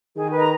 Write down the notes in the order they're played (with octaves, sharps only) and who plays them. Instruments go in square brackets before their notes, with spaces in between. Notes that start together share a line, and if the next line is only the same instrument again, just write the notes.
[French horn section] D#3 [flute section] G#4
[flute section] B4 D#5 A#5